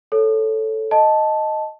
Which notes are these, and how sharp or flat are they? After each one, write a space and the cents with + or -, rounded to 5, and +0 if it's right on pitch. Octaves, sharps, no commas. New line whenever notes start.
A4 +0 C#5 +0
D#5 +0 A5 -5